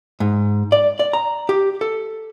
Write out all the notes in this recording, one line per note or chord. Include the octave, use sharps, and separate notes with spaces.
G#2
D5
D5
A#5
G4
A4